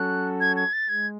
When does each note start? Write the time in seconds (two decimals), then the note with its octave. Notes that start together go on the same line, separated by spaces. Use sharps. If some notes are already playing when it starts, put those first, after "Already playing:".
Already playing: F#3 C#4 F#4 A4 F#6
0.41 G#6
0.56 G#6
0.73 A6
0.89 G#3 G#6